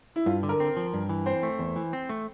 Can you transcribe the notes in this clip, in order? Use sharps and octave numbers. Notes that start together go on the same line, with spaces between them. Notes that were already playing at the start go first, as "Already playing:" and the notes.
E4
G2 F4
D3
A#4
C4
F3
G2
E3
C4 C5
A3
E2
E3
C4
A3